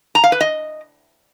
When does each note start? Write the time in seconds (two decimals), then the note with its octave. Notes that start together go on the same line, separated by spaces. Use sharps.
0.15 A#5
0.24 F5
0.32 B4
0.41 D#5